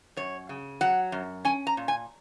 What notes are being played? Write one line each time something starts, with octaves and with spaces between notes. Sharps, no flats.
F#2 C#5
C#3
F#3 F#5
F#2
C#4 G#5
A#5
A#2
G#5